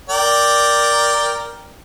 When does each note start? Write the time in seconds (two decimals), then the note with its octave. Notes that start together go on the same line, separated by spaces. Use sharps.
0.09 A#4 D5 G5